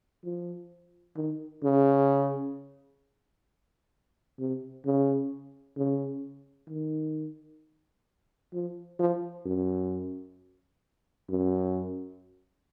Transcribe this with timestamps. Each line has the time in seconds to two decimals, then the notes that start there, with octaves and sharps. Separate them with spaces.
0.25 F3
1.16 D#3
1.64 C#3
4.40 C3
4.86 C#3
5.77 C#3
6.69 D#3
8.53 F3
8.99 F3
9.45 F#2
11.29 F#2